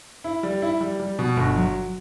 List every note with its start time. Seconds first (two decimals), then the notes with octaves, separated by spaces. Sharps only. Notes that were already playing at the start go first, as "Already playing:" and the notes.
0.24 E4
0.43 G3
0.62 E4
0.81 G3
1.00 G3
1.19 B2
1.37 G1
1.55 F#3